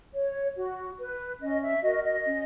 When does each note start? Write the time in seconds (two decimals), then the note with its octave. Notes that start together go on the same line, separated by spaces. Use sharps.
0.15 C#5
0.57 F#4
0.99 B4
1.40 C#4 D#5
1.61 E5
1.82 F#4 A#4 D#5
2.03 D#5
2.24 C#4